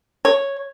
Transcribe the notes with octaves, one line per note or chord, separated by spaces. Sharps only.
C#5